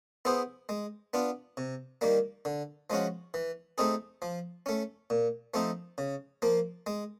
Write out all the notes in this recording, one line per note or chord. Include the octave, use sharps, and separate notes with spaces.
B3 E4 G#4 C5
G#3
B3 D4 F4
C3
D#3 G3 A#3
D3
F3 G#3 C#4 F#4
E3
A3 C4 D#4 G#4
F3
A3 C#4
A#2
F3 A3 C4 D#4
C#3
F3 A#3
G#3